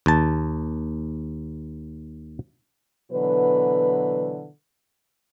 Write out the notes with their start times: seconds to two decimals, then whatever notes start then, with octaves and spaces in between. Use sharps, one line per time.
0.06 D#2 A5
3.12 B2 D3 E3 F#3 B4